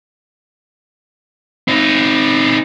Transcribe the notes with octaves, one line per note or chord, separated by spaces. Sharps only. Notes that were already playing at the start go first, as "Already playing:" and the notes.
C4 D#4